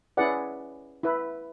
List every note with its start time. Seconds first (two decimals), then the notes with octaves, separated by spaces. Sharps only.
0.17 C#4 E4 G#4 B4 D5 F#5
1.03 E4 B4